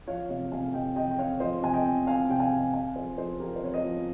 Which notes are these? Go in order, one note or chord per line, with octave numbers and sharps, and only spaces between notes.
F3 C#5 F5
C3 C#5 F5
C3 F5 G#5
C3 D#5 G5
C3 D#5 G5
G5
C4 C#5 F5
F3 C5 D#5
C3 G#5
D#5 G5
C4
C4 F5 G#5
C3 G5
F5 G#5
C3
C4 F5 G#5
F3 G#4 C5
F3 G#4 C5
F3 G4 A#4
C5
C4 C#5
C5 D#5
F3